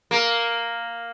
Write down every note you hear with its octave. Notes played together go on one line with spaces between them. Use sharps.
A#3